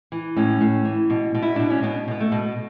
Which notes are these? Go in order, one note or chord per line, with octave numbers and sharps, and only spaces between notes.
E3
A2 C#4
A2
E3
B2
B2
E4
B2 D4
C#4
B2 B3
B2 B3
A3
B2